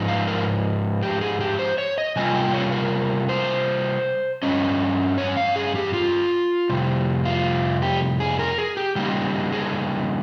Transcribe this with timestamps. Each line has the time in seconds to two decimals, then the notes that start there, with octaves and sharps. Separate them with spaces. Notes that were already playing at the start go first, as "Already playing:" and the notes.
Already playing: G#2 F3 D#4
0.08 F5
0.27 A#4
1.03 G4
1.21 G#4
1.40 G4
1.59 C5
1.78 C#5
1.98 D#5
2.16 C3 G3 A#3 F4 G#5
2.35 G5
2.54 C#5
2.72 A#4
3.29 C5
4.43 G2 G3 C#4 D#5
5.18 C#5
5.37 F5
5.56 G#4
5.75 G4
5.94 F4
6.69 F2 C3 G3
7.25 F4
7.82 G4
8.20 G#4
8.39 A#4
8.58 G#4
8.77 G4
8.95 C#3 G3 A#3 D#4 G4
9.52 G#4